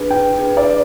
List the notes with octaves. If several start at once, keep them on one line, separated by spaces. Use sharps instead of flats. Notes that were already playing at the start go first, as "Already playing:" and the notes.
Already playing: D4 G#4 B4
G5
D4 G#4 B4
D5